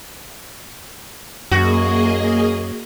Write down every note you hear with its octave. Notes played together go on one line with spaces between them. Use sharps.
F#2 A#3 F#4 G#4 D#5